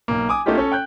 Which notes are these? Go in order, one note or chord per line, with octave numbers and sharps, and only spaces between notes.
B1 A#3
G#5 D6 D#6
A3 A#3 C#4 D#4 F4 G4
C#4 A4
G5 F#6 G6